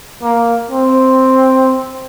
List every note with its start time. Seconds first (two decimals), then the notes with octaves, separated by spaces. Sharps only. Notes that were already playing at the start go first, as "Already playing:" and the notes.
0.22 A#3
0.71 C4